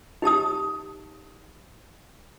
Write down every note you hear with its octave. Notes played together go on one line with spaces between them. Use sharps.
D#4 G4 A5 D#6